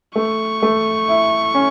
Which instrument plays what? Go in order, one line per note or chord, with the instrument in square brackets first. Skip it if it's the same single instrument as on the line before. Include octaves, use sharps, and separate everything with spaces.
[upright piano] A3 [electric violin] C#6
[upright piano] A3
E4
C#4